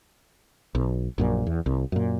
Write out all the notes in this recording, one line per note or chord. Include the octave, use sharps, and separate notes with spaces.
B1
A#1 F#2 A#2
E2
C2
F#2 A#2